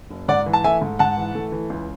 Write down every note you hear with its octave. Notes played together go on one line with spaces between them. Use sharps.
F#1
G#2 D5 F#5
E3
A5
A3 E5 G#5
G#2
G#2 F#5 A5
E3
A3
E3
C#2